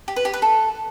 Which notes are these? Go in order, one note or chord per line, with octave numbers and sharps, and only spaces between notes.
G4
B4
G4
B4
A4